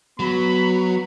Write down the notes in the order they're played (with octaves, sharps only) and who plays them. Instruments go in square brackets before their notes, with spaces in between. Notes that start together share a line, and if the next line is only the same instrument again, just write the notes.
[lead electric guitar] F#3 [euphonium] B3 [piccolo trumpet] B5